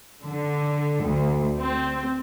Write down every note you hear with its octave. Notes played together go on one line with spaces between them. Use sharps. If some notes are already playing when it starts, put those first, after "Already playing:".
D3
D2
C4